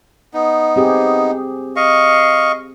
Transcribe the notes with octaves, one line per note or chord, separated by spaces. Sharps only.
B3 D#4
C4 G4 G#4
D#5 F5 C#6